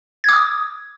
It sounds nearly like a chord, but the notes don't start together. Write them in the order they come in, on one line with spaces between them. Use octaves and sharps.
G#6 D6 D#6